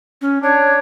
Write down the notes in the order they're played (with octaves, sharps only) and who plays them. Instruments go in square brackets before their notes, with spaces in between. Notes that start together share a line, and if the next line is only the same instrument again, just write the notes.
[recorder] C#4
[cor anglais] D4 [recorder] C#5